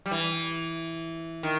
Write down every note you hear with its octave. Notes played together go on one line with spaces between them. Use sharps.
G3
E3
D#3